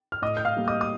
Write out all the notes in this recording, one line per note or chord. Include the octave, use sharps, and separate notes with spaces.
F6
A2 D#5 D#6
G6
F5 F6
G3 A#3
D#5 D#6
D#6